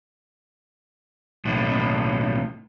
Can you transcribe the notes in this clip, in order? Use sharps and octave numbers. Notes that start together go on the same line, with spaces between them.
B1 A2